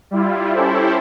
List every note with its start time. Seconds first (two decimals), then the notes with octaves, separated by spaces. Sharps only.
0.11 G3 E4 F4
0.54 C#4 E4 G4 A4 C5